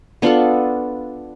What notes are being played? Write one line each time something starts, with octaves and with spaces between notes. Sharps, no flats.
B3 D4 F4 A4